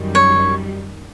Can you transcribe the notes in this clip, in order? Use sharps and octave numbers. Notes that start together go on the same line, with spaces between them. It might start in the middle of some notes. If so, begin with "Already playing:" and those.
Already playing: F#2 D#3 G3
C#5